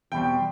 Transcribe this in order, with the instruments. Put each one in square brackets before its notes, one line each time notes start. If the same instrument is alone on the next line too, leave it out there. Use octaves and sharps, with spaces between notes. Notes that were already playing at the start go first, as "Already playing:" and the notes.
[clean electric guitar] E2 B2 G3 C4 [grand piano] G5